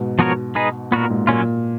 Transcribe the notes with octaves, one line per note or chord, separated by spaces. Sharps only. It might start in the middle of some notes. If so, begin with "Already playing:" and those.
Already playing: G#2 B2
F3 B3 F#4 A#4 C#5
G#3 D#4 G#4 B4
A#2 B3 F#4 A#4
G#2
A#2 F#3 A#3 C#4 F4